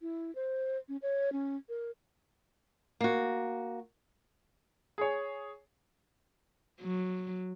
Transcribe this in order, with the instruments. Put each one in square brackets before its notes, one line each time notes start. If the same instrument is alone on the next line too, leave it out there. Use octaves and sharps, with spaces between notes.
[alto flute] E4
C5
C#4
C#5
C#4
A#4
[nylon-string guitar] A#3 F#4
[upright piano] G#4 C#5
[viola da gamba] F#3